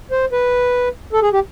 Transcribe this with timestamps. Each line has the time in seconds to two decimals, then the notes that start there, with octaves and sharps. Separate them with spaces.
0.11 C5
0.32 B4
1.13 A4
1.22 G#4
1.33 G4